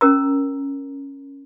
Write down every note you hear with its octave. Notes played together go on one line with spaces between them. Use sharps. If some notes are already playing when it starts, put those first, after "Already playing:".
C#4 A#4 A#5